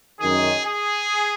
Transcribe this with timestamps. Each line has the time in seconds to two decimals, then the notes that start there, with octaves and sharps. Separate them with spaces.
0.20 F#2 D#3 G#4
0.66 G#4